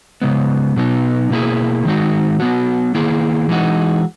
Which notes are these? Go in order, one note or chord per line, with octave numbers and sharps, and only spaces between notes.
C#3 G#3 B3
B2 F#3 B3 D#4
B2 A#3 E4 G#4
D#3 G#3 D#4 F#4
F#3 B3 F#4
D#3 A#3 E4 G#4
E3 G#3 D#4 F#4